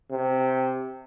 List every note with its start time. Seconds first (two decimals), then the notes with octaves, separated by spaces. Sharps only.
0.11 C3